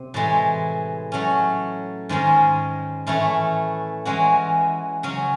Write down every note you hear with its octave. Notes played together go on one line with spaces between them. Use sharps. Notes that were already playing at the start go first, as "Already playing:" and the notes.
Already playing: C3
A2 E3 G#3
F#3 A3 C#4
G#2 D#3 G#3 C#4
A2 E3 A3 C#4 E4
E3 G#3 C#4 F#4
C#3 F#3 C#4